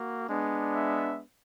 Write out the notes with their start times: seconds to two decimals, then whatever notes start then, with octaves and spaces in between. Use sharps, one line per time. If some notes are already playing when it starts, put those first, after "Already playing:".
Already playing: A#3 F#4
0.28 G#3 B3 D4
0.75 E5